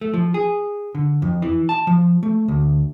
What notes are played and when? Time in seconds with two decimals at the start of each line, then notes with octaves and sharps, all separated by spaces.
0.01 A3
0.14 F3
0.34 G#4
0.95 D3
1.22 F2
1.42 E3
1.69 A5
1.87 F3
2.23 A3
2.48 D2